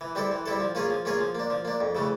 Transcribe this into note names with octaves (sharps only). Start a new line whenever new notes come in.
E3
G3 C4 E4 A4
E3
G3 C4 E4 A4
F3
A#3 C#4 F4 G#4
F3
A#3 C#4 F4 G#4
F3
A#3 D4
F3
A#3 D4
F2
C#3 E3 A3